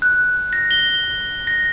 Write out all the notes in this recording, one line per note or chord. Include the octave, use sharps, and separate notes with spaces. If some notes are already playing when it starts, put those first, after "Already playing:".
F#6
A#6
G7
A#6